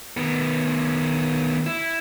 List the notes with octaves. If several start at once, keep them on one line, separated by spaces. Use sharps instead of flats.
D#3 B3
E4